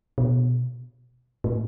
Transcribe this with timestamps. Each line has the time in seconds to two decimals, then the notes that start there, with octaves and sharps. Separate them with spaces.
0.18 B2
1.44 A2